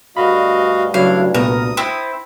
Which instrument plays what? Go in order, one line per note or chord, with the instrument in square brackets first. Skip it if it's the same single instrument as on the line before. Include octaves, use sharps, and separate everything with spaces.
[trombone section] D2 G2 [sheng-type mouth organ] F#4 D#5 F5 [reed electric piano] B5
[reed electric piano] C#3 F#3 [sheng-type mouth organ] D4 E4 [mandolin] F5
[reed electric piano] C2 A#2 B3 [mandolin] A#4 [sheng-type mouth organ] D#6
[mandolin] C4 E4 [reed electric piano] C6